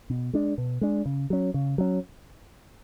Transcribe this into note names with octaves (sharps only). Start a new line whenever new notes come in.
B2
G#3 D4
B2
G#3 D4
C#3
F#3 C#4
C#3
F#3 C#4